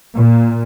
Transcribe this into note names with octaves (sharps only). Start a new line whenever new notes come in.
A#2